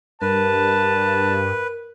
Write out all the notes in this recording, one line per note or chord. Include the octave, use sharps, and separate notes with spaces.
G2 A#4 B4 A5